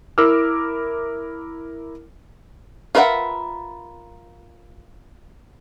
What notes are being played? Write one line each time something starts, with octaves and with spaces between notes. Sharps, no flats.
E4 A#4 D6 E6 F6
F4 A#4 B4 E5 F#5